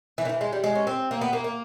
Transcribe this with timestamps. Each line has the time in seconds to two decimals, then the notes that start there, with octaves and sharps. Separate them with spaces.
0.18 E3
0.25 D#3
0.29 E3
0.41 G#3
0.53 G3
0.64 G#3
0.75 C#4
0.87 C4
1.11 A#3
1.21 B3
1.33 A#3
1.44 A#3